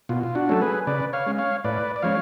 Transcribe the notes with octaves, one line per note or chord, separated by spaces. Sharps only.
B2 F4
F4
D4 F#4
F#3 A3 C#4 A4
G#4 B4
C#3 B4 D5
C#5 F5
G#3 C#4
C#5 F5
A2 B4 D5
D5
F3 G#3 C#4 C#5 F5